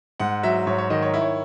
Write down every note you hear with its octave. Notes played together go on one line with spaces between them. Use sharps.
G#2 F#5
F#3 E5
G#2 C#5
C#5
D#3 D#5
C#5
E4
C#5